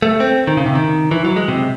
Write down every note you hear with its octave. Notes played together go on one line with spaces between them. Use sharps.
A3
C4
D#3
C#3
C3
D#3
E3
F#3
G#3
C3